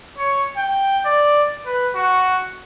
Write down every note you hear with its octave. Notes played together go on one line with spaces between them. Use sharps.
C#5
G5
D5
B4
F#4